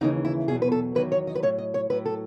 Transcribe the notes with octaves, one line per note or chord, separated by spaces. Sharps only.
D#2 C#3 E3 D#4
E4
E2 B2 F#3 G#4
B4
A4
E2 D#3 F#3 B4
C#5
D#5
B4
A2 F#3 C#5
D#5
C#5
A2 F#3 B4
A4